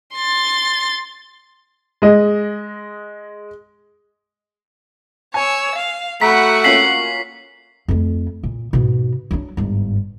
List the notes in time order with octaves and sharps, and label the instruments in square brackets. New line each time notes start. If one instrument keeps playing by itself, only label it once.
[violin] C6 A6
[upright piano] G#3 D#5
[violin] C#5 E6 [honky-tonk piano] G#5
[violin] F5
[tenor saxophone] A3 [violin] F#4 F#5 [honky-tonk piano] A#5 B5 [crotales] B6
[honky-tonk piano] A#3 C#4 F4 [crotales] B6 C7 F#7
[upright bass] F2 A3
A#2
G#2 B2
F#3 D4
G1 G#2